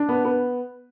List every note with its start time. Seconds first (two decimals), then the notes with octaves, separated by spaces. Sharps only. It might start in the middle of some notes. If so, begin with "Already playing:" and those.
Already playing: D4
0.09 B3
0.25 B3